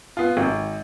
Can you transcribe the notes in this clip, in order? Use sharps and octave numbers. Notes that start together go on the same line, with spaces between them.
B3 F4
G#1